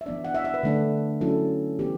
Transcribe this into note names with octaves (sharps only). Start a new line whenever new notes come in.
E5
E3 B3 D4 D5
F#5
E5
E5
B4
D3 A3 D4
F#3 C#4 E4 A4
E3 B3 G4